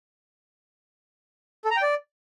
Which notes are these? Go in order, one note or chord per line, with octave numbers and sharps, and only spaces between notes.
A4
A#5
G5
D5